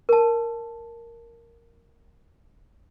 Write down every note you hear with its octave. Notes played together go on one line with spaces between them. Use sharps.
A#4 A5